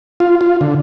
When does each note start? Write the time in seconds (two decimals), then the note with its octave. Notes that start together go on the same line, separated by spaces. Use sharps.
0.20 F4
0.41 F4
0.61 D3